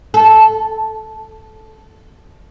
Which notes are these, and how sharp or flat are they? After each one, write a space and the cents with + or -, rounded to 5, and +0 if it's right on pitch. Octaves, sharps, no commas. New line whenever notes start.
A4 -10